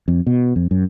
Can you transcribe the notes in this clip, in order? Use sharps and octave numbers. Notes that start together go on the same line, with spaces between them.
F2
B2
F2
F#2